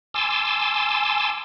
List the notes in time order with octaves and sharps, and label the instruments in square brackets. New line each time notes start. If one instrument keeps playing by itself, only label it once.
[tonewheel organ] G#5 A5 C6 D6 E6